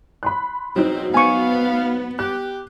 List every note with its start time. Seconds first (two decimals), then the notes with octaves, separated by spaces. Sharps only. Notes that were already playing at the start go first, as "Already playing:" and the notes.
0.23 B5 C6 F#6
0.76 E2 B2 F#3 C4 D#4 C5
1.14 B3 F5 G#5 C#6
2.19 G4 F#6